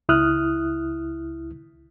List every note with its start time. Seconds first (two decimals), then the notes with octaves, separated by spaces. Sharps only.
0.09 C#2 E4 D#6 F6 F#6